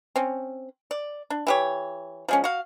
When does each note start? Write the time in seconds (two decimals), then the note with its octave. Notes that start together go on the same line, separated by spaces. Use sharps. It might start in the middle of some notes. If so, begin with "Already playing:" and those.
0.16 C4 C#4
0.91 D5
1.30 D4
1.47 E3 G4 C#5
2.28 F3 G#3 C#4
2.44 F#4 F5